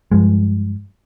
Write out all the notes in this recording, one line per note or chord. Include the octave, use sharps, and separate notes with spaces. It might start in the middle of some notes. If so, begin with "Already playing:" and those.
G2 F3 G#3